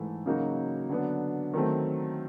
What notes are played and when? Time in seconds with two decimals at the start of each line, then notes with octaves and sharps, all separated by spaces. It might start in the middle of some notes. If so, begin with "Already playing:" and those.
Already playing: G#2 E3 A3
0.26 C#3 F#3 A#3 D#4 F#4
0.90 D3 F#3 B3 D4
1.53 D#3 F#3 A3 C4